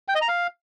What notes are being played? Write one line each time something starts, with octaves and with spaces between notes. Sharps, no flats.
G5
D#5
A#5
F5